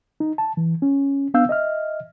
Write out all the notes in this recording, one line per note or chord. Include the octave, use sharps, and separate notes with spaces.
D#4
A5
E3
C#4
B3 D4 F5 E6 G6
D#5 E5 F6